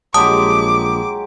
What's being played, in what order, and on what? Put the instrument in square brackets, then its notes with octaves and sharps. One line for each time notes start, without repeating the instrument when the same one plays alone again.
[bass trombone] A#1 [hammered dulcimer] F#3 G#3 G4 [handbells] A5 D#6 [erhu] D6